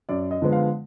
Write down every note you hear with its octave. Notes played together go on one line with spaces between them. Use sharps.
F#2 D5
D#5
D3 F3 G#3 B3
F5